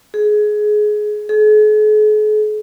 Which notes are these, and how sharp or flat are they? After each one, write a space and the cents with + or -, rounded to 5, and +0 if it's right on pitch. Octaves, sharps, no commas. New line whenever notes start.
G#4 +20
G#4 +45